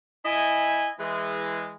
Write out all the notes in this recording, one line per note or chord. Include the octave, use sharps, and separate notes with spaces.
E4 D#5 G#5
E3 G#3